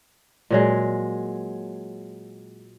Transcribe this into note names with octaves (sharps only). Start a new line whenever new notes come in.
A#2 F#3 G#3